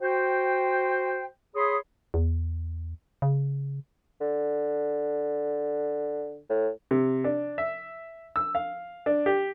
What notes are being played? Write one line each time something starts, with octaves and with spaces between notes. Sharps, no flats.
F#4 C5 G5
G#4 C#5 B5 C6 D#6
E2
C#3
D3
A2
C3
D4
E5
E6
F5
D4
G4